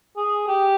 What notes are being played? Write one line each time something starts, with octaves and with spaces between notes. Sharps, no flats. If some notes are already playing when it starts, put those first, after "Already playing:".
G#4
G4